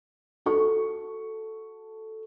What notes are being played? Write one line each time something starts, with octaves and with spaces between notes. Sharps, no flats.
F#4 A4 C#6